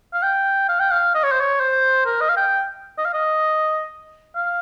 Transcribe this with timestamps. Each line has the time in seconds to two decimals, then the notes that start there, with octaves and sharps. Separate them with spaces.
0.14 F5
0.23 G5
0.69 F5
0.79 G5
0.91 F5
1.15 D#5
1.23 C#5
1.32 C5
1.40 C#5
1.60 C5
2.06 A#4
2.21 D#5
2.29 F5
2.37 G5
2.98 D#5
3.05 F5
3.14 D#5
4.36 F5